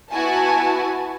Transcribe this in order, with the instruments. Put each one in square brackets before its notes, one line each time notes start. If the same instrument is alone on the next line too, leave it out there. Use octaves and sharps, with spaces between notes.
[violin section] B3 E4 F#4 G#5 A5